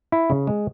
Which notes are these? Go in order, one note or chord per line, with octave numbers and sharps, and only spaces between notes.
E4
C#3
G#3